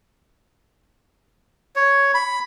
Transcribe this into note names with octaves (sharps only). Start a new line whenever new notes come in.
C#5
B5